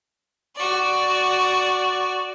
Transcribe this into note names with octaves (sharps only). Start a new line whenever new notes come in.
F#4 D5